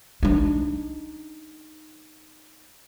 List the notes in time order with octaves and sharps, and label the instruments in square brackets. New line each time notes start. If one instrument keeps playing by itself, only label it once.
[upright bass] D4 D#4